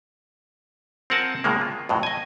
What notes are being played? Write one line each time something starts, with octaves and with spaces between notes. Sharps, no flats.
C4 F4 A#4 F#5 G#5 A5
A2 C#3 G#3 A#3
F4
F2 A2 F#3
D#5 G#5